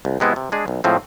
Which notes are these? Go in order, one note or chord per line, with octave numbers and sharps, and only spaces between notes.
C2
C3 G#3 B3 E4
C3
G#3 D4 G#4
B1
A2 F3 G#3 C4